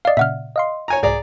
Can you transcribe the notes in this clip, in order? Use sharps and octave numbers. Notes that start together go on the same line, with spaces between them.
D5 D#5 F5 C7
A#2 C#3 E5 F#5 F6
D#5 F5 C6
C#5 G#5 A#5
C2 G#2 G#4 D5 A#5